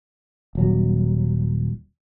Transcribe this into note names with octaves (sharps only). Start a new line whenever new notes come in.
D#1 F#3